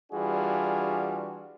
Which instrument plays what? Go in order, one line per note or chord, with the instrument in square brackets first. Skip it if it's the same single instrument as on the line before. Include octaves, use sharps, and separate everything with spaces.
[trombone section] E3 G3 D4 F4 F#4 G#4